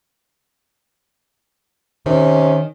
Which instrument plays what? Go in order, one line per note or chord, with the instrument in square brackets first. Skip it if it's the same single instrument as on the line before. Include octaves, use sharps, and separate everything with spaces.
[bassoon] C3 [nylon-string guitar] D#3 [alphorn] C#4